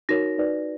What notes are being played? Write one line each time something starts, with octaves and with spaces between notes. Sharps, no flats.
D#4 F#4 A#4 C#5 A#6
D#4 F#4 B4 D5